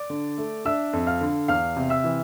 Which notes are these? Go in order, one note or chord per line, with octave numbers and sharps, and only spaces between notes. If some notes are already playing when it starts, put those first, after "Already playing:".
Already playing: D5 D6
D3
A3
D4 E5 E6
F2
F5 F6
D3
E2 F5 F6
C3
E5 E6
E3